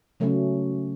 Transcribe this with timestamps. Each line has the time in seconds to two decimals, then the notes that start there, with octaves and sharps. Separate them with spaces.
0.20 C#3 F#3 A3 C#4